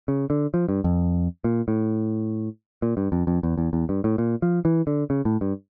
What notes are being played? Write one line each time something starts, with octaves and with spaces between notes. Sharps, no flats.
C#3
D3
F3
G2
F2
A#2
A2
A#2
G2
F2
F2
E2
E2
E2
G2
A2
A#2
F3
E3
D3
C#3
A2
G2